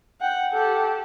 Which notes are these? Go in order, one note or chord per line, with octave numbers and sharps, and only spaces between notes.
F#5 G5
G4 A4